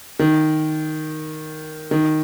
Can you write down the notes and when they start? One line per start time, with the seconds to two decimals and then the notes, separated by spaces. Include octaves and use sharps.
0.19 D#3
1.91 D#3